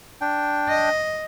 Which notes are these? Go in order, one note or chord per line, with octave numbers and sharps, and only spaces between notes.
D4 G5
D#5